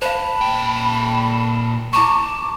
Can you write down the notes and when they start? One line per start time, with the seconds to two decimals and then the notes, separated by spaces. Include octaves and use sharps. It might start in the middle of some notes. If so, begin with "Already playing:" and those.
0.02 C5 F5 A5 B5
0.41 A#2 G5
1.93 E4 A5 A#5 C#6 D6